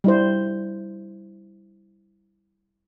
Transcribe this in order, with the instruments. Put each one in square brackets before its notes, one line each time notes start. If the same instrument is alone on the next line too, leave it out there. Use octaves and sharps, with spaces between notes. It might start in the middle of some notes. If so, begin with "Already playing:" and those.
[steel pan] G3 E4 C5